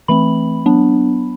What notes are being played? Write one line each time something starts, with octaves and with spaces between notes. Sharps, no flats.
E3 A3 C4 B5
F#3 B3 D4